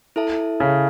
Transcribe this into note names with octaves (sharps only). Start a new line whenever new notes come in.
E4 A4 E5 A5
C#3